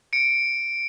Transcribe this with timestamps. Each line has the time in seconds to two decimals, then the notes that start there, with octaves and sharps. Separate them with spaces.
0.13 C#7 D7